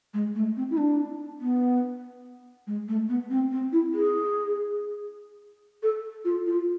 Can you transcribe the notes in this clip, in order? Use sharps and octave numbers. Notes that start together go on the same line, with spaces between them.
G#3
A3
C4
E4
D4
B3
G#3
A3
B3
C4
C4
E4
G#4
A4
F4
F4